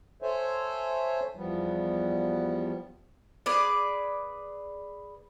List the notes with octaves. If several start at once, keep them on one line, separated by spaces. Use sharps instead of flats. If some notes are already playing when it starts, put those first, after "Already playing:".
A4 C5 C#5 E5 G#5
E2 F3 G3 B3
G#4 B4 D5